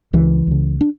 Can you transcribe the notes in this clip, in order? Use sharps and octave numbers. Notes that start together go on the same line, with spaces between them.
C#2 C#3 E3
C#2 C#3
D4